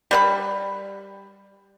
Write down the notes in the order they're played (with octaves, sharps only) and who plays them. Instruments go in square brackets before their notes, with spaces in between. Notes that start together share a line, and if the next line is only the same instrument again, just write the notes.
[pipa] G3 B4 B5